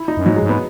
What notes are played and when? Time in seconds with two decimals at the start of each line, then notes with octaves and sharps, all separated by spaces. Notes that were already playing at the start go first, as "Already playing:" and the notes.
Already playing: E4
0.08 D#4
0.17 F#2
0.26 G#2 F#3
0.37 G#3
0.43 G#2
0.49 B3